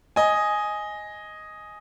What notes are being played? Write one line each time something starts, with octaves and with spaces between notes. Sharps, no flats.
D#5 G#5